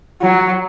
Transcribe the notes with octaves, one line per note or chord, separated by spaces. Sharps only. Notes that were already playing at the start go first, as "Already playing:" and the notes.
F#3